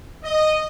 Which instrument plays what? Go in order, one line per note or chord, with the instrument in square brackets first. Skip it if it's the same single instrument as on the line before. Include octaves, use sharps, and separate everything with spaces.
[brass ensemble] D#5